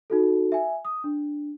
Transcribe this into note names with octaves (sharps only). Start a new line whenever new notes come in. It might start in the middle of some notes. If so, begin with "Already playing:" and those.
D#4 F#4 A4
E5 G#5
D#6
D4